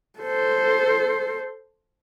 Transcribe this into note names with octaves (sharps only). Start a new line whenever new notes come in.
A4 C5